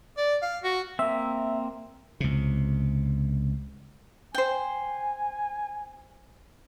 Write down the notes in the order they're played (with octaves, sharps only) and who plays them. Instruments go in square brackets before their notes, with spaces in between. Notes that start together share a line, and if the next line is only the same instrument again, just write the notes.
[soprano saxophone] D5
F5
F#4
[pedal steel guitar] A#3 C4 [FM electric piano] E5
[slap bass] C#2 C3
[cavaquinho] C5 G5 [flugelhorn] G#5